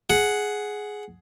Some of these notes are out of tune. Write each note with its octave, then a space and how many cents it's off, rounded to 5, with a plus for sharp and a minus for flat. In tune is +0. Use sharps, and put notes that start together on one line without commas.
G#4 +10 F#5 +0